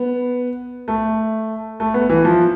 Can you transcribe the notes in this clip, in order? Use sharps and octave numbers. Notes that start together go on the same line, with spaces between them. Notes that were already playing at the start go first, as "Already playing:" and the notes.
Already playing: B3
A3
A3
B3
E3
F3